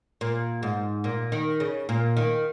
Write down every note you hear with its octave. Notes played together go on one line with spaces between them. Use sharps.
A#2
G#2
A#2
D#3
C#3
A#2
D#3